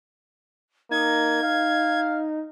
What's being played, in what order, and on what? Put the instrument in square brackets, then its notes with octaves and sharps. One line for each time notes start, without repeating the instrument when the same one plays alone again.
[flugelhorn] A#3 [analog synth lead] D#4 [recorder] G#6
[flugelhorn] F5